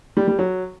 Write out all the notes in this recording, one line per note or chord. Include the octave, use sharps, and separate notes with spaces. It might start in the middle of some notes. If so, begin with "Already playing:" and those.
G3
G3
F#3